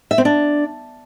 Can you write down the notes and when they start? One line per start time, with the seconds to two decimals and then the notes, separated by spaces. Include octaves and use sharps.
0.11 E5
0.18 C4
0.25 D4